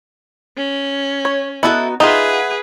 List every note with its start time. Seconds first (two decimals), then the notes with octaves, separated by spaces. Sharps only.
0.57 C#4
1.25 C#5
1.63 B3 D#4 E4 F#4 A4
2.00 D#4 F4 G#4 B4 E5 F#5